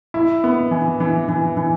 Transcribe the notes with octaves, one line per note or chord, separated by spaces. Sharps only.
E4
B3
E3
E3
E3
E3